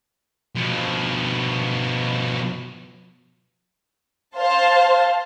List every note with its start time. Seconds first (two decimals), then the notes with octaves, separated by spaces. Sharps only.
0.55 B2 F3
4.37 C5 F5 A5